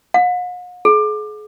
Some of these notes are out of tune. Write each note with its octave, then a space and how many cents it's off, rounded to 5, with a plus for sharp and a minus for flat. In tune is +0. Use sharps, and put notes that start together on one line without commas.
F#5 -45
G#4 +40